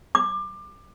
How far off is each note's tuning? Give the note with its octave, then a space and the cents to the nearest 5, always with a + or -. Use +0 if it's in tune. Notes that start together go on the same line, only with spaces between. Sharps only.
D6 +25